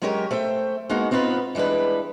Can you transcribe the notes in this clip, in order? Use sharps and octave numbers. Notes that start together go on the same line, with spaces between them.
F#3 G#3 C#4 G4 A#4 C#5
A3 C5 E5 G5
G#3 A#3 B3 D#4 F#4
B3 C4 D#4 F4 B4
E3 G3 G#3 D4 B4